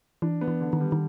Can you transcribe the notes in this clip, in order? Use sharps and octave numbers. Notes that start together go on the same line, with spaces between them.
E3 D4
B3
E3
D3
D#3
G3
D#3